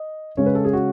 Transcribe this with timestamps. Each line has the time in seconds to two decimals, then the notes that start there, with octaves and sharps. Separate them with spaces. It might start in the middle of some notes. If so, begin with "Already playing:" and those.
Already playing: D#5
0.37 C#3 G#3 C#4 C#5
0.46 B4
0.55 A4
0.64 G#4
0.73 F#4